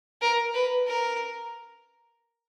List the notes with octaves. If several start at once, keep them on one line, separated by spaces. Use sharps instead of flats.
A#4
B4
A#4